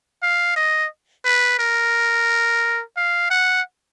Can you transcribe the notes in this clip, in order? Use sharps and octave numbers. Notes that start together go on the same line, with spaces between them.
F5
D#5
B4
A#4
F5
F#5